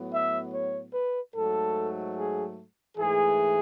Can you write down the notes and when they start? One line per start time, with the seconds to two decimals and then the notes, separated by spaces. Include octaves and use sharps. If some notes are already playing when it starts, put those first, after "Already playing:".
Already playing: A2 F#3 B3
0.13 E5
0.53 C#5
0.94 B4
1.35 G#2 F#3 A3 A4
2.16 G#4
2.97 G#2 E3 A3 G#4